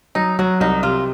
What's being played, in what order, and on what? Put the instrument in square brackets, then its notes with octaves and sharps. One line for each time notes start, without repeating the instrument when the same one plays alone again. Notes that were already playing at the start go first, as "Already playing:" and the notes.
[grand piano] F#3 [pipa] D#4
[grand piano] F#3 [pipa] F#4
[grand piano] C2 [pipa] D#4
[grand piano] C3 [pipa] F4